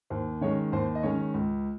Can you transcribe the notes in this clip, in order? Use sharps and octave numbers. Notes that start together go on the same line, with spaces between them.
D#2 C5
D#3 G#3 C#4 C#5
D#2 C5
D#5
D#3 G#3 C#4 C#5
C#2